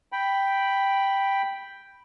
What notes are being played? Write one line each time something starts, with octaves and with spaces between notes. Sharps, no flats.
G5 B5